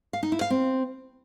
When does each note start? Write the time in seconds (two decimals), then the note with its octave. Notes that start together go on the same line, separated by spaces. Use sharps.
0.13 F5
0.23 D#4
0.32 E4
0.41 F5
0.50 C4